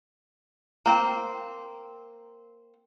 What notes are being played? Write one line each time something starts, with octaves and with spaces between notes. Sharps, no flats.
A#3 C4 C5